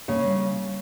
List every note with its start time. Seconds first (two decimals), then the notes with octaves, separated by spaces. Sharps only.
0.08 C#3 A#3
0.24 G3